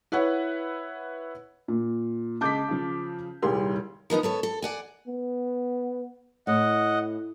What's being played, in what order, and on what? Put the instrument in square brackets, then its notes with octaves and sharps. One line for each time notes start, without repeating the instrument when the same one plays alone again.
[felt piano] E4 B4 C#5 F#5
A#2
[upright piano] C#3 G#3 B6 [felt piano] A5 D6 G6
[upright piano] C#3 F3
[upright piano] D#1 C2 C6 [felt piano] G4 G#4
[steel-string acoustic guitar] D#3 F3 B3 D#4
B3 A4 C#5
A4
D5 F#5 G#5
[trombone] B3
[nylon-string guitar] A2 [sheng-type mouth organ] D#5 F#5